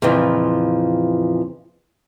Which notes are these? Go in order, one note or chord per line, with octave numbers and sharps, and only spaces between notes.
F2 A#2 C#3 E3 F3